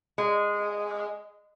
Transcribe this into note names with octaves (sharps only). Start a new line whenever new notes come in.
G#3